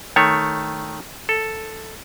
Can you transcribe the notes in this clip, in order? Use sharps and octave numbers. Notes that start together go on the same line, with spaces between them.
D#3 A3 C#5
A4